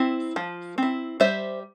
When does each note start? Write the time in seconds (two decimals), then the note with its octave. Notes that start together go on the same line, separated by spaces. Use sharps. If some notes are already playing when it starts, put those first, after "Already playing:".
Already playing: C4 E4
0.36 F3
0.78 C4 E4
1.20 G3 C5 E5